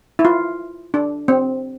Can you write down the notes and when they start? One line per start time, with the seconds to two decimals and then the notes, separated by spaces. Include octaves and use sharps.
0.19 E4
0.25 F4
0.94 D4
1.28 C4